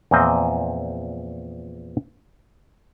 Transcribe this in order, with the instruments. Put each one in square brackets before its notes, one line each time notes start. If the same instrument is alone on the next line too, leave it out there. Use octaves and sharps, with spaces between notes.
[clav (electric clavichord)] E2 A#2 F3 C4 D#5 G5